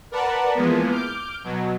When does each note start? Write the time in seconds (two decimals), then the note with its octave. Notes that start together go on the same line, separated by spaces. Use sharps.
0.11 A#4 B4 D5 F#5 A5 B5
0.55 E3 F3 G#3 A#3 B3
0.90 D6 F6 G6 D7
1.44 B2 F#3